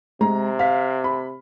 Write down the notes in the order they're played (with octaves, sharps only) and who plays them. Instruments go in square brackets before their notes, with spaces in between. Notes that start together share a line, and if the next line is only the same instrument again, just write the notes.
[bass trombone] C3 [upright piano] G#3 A#5
[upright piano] F5 B6
B5